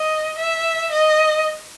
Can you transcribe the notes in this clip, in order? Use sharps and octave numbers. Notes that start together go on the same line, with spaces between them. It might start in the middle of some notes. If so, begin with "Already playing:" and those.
Already playing: D#5
E5
D#5